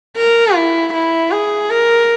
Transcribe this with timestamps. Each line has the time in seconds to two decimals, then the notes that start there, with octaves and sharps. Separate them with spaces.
0.17 A#4
0.55 E4
0.94 E4
1.32 G#4
1.70 A#4